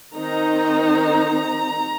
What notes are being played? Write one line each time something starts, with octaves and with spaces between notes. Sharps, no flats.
D#3 C4 D#4 A#5